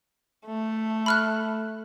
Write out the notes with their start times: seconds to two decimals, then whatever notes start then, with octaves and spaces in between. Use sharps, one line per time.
0.46 A3
1.06 B5 F6 F#6